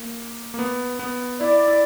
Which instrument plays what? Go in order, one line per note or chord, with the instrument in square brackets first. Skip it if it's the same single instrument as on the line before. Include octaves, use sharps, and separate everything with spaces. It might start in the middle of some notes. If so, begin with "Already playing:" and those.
Already playing: [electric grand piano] A#3
A#3
B3
B3
[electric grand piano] E4 [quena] D5
[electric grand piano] E4